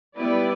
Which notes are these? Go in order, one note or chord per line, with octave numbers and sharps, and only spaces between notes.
G3 B3 E4 B4 D5